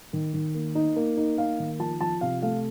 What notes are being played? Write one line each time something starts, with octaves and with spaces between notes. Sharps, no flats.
D#3
D#3
A#3
D#4
A#3
D#4
A#3 F5
D#3
F3 A5
F3 A5
C3 F5
A3 F5